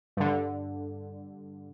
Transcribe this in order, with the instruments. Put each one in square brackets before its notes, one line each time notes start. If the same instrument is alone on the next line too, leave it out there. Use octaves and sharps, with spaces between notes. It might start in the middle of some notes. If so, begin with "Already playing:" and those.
[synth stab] G2 D3